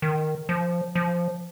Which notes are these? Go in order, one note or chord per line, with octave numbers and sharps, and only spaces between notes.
D#3
F3
F3